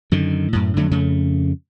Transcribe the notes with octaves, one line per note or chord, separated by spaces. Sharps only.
F#2 D3 D#3
F#2 A2
F2 D3 F#3 A3
F2 C#3 A3